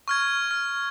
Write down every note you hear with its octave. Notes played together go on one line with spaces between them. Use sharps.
C#6 F6 G#6
F6